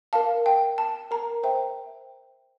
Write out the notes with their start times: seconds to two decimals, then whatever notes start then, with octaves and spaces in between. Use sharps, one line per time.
0.13 A#4 F5 A5
0.46 G5
0.78 A5
1.11 A#4 A#5
1.43 C5 E5 G5